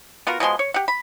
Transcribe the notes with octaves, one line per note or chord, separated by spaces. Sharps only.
B3 F4 F#4 A#4
B2 F3 G#3 C6
C#5
G4 F#5
B5